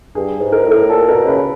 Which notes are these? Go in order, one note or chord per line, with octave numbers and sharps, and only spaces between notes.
G2 G#4
G#2
A#4
A2
A#4
A#2 A4
B2 A#4
C#3 B4